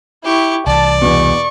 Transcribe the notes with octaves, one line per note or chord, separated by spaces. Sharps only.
E4 G4 C#6
C2 E3 D5 A5
E2 B2 C#6